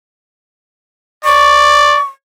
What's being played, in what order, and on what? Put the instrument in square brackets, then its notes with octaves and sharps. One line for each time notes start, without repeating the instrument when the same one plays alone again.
[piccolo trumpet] D5 [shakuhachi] C#6